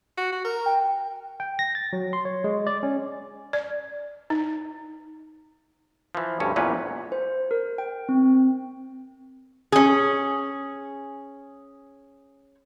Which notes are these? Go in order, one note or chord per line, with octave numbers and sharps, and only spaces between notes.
F#4
F#4
A#4
G5
G5
A#6
A6
F#3
C6
C#5
G#3
D5
C#4
D5
D#4
E3 F3
D2 G2 C#4
A#1 E2 A#2 C#4 B4
C5
A#4
G5
C4
C#4 G#4